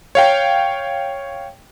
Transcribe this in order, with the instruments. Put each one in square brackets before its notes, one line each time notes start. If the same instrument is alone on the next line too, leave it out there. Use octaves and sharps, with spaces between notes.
[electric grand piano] C#5 F5 G5